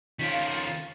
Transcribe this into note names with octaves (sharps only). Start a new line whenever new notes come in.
D#3 C#4 F4 B6 D7
F5